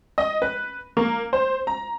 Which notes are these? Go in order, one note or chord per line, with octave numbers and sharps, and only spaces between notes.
D#5
B4
A#3
C5
A#5